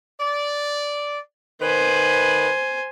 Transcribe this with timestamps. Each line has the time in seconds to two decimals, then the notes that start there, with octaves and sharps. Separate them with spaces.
0.20 D5
1.61 D#3 B4 C5 G#5